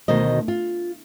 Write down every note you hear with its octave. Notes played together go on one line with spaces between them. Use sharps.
D2 B2 D#3 C5 D#5
F4